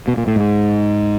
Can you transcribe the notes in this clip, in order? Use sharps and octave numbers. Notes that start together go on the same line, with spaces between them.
B2
A#2
A2
G#2